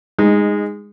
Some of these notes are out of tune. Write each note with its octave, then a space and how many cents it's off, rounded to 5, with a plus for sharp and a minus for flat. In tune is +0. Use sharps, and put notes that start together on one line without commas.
G#3 -15 D#4 +0